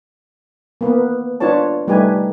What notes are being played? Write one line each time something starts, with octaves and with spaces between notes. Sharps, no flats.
A#3 B3 B4
D4 F4 B4 C#5 A5
G3 A3 D#4 G4 B4 G#5